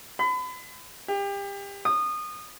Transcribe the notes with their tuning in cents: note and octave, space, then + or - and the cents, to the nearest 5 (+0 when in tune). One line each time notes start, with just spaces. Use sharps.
B5 +35
G4 +30
D#6 -25